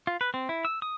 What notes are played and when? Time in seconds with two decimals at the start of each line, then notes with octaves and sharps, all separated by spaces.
0.07 F4
0.21 B4
0.34 C4
0.49 E4
0.65 E6
0.82 D#6